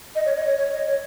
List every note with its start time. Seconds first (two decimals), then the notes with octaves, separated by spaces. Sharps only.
0.15 D#5
0.26 C#5
0.37 D#5
0.47 C#5
0.58 C#5
0.72 D#5
0.87 C#5